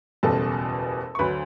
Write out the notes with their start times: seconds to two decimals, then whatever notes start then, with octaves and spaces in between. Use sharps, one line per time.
0.23 F#1 E2 B2 G3 A4 A5
1.15 C#6
1.19 D2 D3 F#3 B4 B5